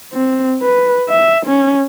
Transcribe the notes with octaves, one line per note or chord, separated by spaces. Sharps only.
C4
B4
E5
C#4